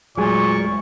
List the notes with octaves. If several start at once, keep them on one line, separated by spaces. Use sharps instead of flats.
E1 A#2 F#3 G#3 A3 G#4 C#6